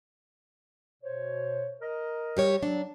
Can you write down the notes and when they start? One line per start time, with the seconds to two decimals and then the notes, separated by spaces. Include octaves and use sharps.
1.02 B2 C5 C#5
1.81 A#4 D#5
2.37 G3 G4 C#5
2.63 F#3 D4